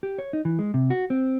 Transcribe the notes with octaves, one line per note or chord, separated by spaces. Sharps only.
G4
C#5
D#4
E3
G#3
C3
F#4
C4